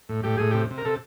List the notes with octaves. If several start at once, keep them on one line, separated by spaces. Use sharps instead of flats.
A2
A2 G4
A2 G#4
C3 G4
C3
A#4
C3 A4